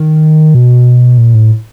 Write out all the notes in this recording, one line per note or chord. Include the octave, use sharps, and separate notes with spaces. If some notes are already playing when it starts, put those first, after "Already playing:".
Already playing: D#3
B2
A#2
A2